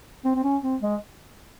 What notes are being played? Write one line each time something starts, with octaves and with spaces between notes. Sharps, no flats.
C4
C4
C#4
C4
G#3